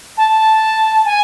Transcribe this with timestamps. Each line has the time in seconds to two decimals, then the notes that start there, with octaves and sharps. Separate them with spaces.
0.17 A5
1.05 G#5